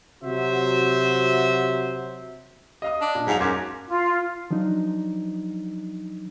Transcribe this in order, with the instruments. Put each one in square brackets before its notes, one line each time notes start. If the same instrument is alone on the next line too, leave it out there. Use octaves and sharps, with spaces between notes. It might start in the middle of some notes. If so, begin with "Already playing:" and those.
[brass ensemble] C3 F#3 F#4 C5 E5
[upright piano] D#5 F5 D#6
[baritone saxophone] D4
[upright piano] A#2
[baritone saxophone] G#2 [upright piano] F#3 F5 F7
[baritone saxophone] F#2 [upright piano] C6 D6 G#6
[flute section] F4
[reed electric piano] F3 F#3 D4 D#4